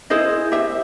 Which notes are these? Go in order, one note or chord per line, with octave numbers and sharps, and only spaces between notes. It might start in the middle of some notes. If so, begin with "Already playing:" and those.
E4 G#4 C5 D#5
G4 E5